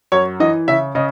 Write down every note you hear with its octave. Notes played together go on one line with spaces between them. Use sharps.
F#2 C#5
E3 D#5
C#3 E5
C#3 D#5